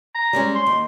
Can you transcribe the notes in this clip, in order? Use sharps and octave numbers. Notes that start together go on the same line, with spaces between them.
A#5
G3 G#3 C#4
C6
D#2